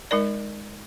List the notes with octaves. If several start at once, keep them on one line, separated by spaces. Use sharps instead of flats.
G#3 D#4 A#4 D5